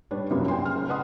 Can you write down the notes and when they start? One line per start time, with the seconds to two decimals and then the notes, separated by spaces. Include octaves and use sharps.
0.11 G3 D4 B4 C#5
0.31 C2 F#2 F#3 A#3 B3
0.48 G5 G#5 C6
0.63 C#3 F6
0.75 F#1
0.88 B4 D5 D#5 F#5 C6 D#6